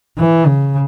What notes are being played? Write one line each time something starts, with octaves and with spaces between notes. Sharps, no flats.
E3
C#3